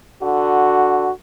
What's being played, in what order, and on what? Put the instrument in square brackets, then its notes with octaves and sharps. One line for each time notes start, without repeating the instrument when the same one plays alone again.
[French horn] D3 [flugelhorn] F#4